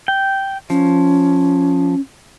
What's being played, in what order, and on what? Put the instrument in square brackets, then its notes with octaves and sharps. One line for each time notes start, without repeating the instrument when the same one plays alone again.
[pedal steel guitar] G5
[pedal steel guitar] F3 [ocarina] C#4